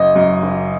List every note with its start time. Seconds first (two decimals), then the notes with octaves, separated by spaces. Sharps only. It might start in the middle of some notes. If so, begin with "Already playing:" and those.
Already playing: F#1 D#5
0.16 F#2
0.43 F#1